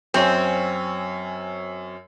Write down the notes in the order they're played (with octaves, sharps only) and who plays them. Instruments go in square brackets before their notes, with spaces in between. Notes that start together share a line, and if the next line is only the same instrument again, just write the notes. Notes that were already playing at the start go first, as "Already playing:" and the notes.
[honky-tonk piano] F#2 C#5 G#5 [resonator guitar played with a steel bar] C4